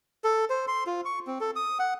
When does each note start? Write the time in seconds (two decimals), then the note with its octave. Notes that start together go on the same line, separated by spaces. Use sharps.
0.24 A4
0.50 C5
0.68 C6
0.87 F4
1.05 C#6
1.27 C4
1.40 A4
1.56 D#6
1.79 F#5